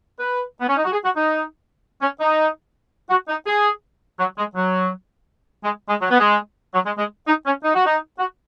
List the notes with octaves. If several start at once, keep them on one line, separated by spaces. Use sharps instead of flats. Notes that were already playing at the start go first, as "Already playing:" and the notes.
B4
B3
C#4
D#4
F#4
G#4
F#4
D#4
C#4
D#4
F#4
D#4
G#4
F#3
G#3
F#3
G#3
G#3
F#3
B3
G#3
F#3
G#3
G#3
D#4
C#4
D#4
F#4
D#4
F#4